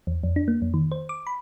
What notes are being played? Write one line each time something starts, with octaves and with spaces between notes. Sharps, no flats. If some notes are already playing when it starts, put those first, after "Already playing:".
E2
F2
D4
A#3
F2
D#3
C5
D6
B5